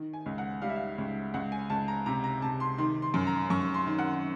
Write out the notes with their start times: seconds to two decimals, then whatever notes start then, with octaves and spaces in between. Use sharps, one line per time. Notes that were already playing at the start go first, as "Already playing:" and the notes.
Already playing: D#3
0.13 G#5
0.26 C#2
0.38 F#5
0.62 G3 F5
0.69 E5
0.76 F5
0.98 C#2
1.34 C#2 F#5
1.52 G#5
1.70 C#2 A5
1.88 A#5
2.06 C3 A#5
2.24 A#5
2.42 C3 A5
2.60 C6
2.78 D#3 C6
3.02 C6
3.14 F#2
3.27 A#5
3.50 F#2 C#6
3.74 C6
3.87 D#3
3.98 F#5